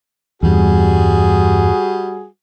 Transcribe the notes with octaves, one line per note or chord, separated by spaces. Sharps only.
E2 G2 G3 F#4 G#4